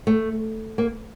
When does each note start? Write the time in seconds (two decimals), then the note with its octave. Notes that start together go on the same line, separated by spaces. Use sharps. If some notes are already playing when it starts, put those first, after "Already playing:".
0.07 A3
0.78 A#3